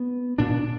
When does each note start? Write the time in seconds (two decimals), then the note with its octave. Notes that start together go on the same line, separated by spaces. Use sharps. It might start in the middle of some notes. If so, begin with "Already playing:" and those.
Already playing: B3
0.38 A#2 D4